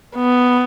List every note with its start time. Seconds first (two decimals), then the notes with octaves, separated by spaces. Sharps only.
0.16 B3